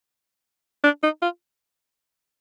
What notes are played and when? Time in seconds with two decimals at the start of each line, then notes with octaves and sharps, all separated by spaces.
0.84 D4
1.03 D#4
1.22 F4